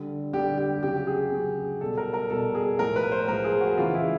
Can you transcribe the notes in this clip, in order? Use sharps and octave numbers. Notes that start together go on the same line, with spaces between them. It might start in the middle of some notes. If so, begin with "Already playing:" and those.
Already playing: D3 G3
D3 G3 G4
G4
C#3 F#3 G4
G#4
C#3 F#3
B2 G3 A4
A#4
A#4
B2 G3 A4
G#4
A2 F3 G#3 A#4
B4
C5
A2 F3 G#3 A#4
G#4
F#4
C#3 E3 G#3 F4
E4